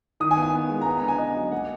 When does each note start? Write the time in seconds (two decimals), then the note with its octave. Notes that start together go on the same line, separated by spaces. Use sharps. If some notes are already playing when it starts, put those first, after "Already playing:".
0.20 D#3 D#6
0.31 G#5
0.37 B3
0.43 G#5
0.54 B3
0.70 G#3
0.81 A#5
0.86 B3 G#5
0.98 D3 A#5
1.08 G#5
1.19 B3 D#5
1.36 F#3
1.52 A#3 F#5